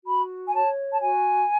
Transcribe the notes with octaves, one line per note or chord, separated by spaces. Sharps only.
F#4 B5
G#5
C#5 A5
A5
F#4 G#5